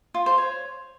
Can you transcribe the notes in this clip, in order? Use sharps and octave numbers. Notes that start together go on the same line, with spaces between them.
F4
C5
C#5